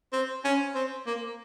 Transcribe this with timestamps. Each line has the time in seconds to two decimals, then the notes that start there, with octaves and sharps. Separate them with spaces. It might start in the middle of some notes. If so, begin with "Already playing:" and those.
0.13 C4
0.44 C#4
0.75 C4
1.06 A#3